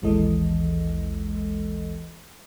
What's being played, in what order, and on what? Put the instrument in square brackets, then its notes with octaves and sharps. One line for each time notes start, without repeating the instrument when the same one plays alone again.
[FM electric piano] A1 D#2 E3 G#3 A4 D#5